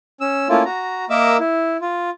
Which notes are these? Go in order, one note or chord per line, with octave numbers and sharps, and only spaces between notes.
C#4 E6
A3 A#3 C#4 E4 F4
F#4 A#5
A#3 A#4 D#5 E5 D6 E6
E4
F4